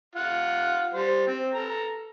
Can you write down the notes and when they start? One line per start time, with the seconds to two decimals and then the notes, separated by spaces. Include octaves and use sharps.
0.15 F4 F#5
0.93 G3 C5
1.27 C4
1.54 A4 A#5